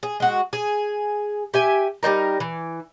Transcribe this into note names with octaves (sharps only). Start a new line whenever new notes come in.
G#4
G#3 F#4
G#4
G4 E5 G#5
G3 C#4 D#4 A#4
E3